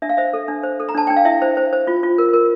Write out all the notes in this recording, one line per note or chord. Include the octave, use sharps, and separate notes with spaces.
D4 E5
F5
C5 E5
A4
D4
C5
A4
A#5
D4 A5
D4 G5
F5
E4 E5
C5
C5
C5
F4
F4
A#4
A#4